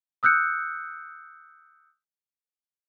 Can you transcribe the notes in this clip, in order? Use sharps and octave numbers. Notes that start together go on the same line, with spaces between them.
D#6 E6 F#6 G6 C#7